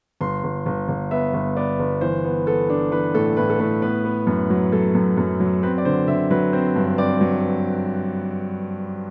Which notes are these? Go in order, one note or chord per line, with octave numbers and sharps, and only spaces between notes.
G1 C6
G1
G1
G1
B3 E5
G1
B3 D5
G1
E3 C5
B3
B3 A4
D4
E3 B4
A2 A4
A2 B4
A4
A2 B4
B3 B4
B3
F#2
F#3
F#3 A4
F#2
F#2
F#3
C4 B4
D5
D3 C5
D3 E5
F#3 B4
C4 C5
G2
C4 D5
F#3